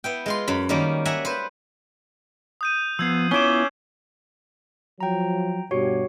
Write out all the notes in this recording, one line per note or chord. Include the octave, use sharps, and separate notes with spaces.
B3 E4 G5
G#3 F4 C6
F#2 B5
D#3 G3 A#3 C#4
E5 F#5 G#5 A#5
B4 C5
D#6 G6 D#7
F3 B3 E6 G#6 C7
B3 C#4 E4 F4 D6 E7 G7
F3 F#3 G5 A#5
G2 B2 F#4 G4 C#5